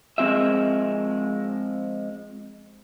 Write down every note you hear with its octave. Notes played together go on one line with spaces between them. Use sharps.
F3 G#3 C4 G4 E5